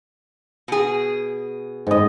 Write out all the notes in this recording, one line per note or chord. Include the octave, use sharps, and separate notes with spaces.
B2 G#4
G#2 D#5